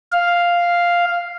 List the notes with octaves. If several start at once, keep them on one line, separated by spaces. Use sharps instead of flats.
F5